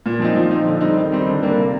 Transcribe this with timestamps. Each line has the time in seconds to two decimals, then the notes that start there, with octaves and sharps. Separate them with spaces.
0.06 A#2
0.20 F3 C4 D#4
0.36 F3
0.51 C4 D#4
0.66 D3
0.81 G3 C4 D#4
0.96 D#3
1.12 G3 C4 D#4
1.27 D3
1.43 G3 A#3 D4
1.58 C3